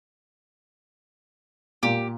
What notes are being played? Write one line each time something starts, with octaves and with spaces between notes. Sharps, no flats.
A#2 G4